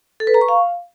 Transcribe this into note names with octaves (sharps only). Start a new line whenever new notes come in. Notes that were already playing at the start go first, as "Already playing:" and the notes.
A4
B4
A#5
C#6
F5